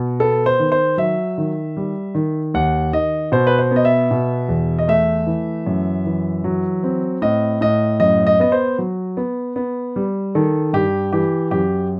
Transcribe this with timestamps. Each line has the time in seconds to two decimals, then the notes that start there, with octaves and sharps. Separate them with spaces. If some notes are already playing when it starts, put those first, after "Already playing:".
Already playing: B2
0.20 B3 A4
0.46 C5
0.59 D#3
0.72 C5
0.98 F#3 E5
1.38 D#3
1.77 G3
2.15 D#3
2.54 D#2 F#5
2.93 D#3 D#5
3.32 B2 C5
3.47 B4
3.59 C5
3.71 B3 D#5
3.85 E5
4.11 B2
4.49 E2
4.79 D#5
4.88 A3 E5
5.27 E3
5.67 F#2
6.06 E3
6.44 F#3
6.84 C4
7.22 A2 D#5
7.61 A2 D#5
8.00 F#2 D#5
8.27 D#5
8.40 B3 D#5
8.52 C5
8.79 F#3
9.17 B3
9.56 B3
9.96 G3
10.35 D#3 A4
10.73 G2 G4
11.13 E3 G4
11.51 F#2 G4